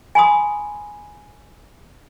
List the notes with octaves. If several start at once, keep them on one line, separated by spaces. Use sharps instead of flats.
G#5 B5 C6 D#6